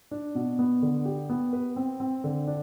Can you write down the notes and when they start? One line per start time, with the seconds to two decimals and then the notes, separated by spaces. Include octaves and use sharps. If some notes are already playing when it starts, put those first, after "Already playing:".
0.11 D4
0.35 B2
0.59 B3
0.82 D3
1.05 G4
1.29 B3
1.53 B4
1.76 C4
2.00 C4
2.24 D3
2.47 D4